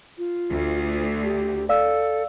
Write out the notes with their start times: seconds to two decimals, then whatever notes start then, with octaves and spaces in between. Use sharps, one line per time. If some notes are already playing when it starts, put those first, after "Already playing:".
0.18 F4
0.50 D2
1.24 G4
1.69 A4 D5 F5 E6